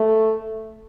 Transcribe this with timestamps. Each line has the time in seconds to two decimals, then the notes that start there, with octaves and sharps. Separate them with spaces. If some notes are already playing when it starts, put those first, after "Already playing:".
Already playing: A3